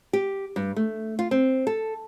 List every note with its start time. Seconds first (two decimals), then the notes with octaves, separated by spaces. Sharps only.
0.13 G4
0.56 G2
0.76 A3
1.19 F4
1.31 C4
1.67 A4